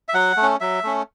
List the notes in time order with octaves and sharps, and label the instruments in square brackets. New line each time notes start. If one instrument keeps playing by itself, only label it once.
[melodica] E5
F#3 F#5
A3
C#4
F#3 E5
A3 C#4